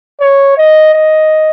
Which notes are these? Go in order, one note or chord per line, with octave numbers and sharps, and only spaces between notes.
C#5
D#5
D#5